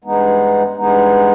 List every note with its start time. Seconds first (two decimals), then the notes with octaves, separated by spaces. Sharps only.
0.04 G2 E3 G#3 B3 D#4
0.77 G2 E3 G#3 B3 D#4